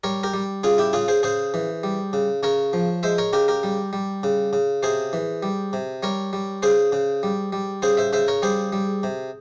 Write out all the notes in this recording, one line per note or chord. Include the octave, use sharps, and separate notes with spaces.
G3 A#4 C#5
G4 A#4
G3
C#3 F4 G#4
E4 G4
C#3 F4 G#4
G#4 C5
C#3 G#4 C5
E3
G3
C#3
C#3 A#4 C#5
F3
G#3 C5 E5
A#4 C#5
C#3 G4 A#4
G4 A#4
G3
G3
C#3
C#3
C3 G#4 C5
E3
G3
C3
G3 A#4 C#5
G3
C#3 G#4 C5
C#3
G3
G3
C#3 G#4 C5
C5 E5
C#3 C5 E5
A#4 C#5
G3 G#4 C5
G3
C3